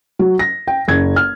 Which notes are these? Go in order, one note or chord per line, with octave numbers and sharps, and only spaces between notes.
F#3
A#6
G5
F#1 G#6
F6